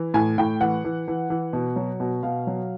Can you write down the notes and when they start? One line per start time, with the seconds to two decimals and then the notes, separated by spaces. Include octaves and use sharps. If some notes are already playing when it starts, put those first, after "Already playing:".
Already playing: E3
0.14 A2 G#5
0.38 A2 G5
0.61 E3 F#5
0.84 E3
1.08 E3
1.30 E3
1.53 B2
1.76 F#3
2.00 B2
2.23 B2 F5
2.47 F#3